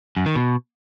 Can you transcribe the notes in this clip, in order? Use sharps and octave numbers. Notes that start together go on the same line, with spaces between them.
F#2
D#3
B2